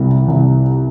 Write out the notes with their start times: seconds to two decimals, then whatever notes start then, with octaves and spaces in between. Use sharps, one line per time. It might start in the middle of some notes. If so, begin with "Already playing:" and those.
Already playing: C2 G3
0.28 C2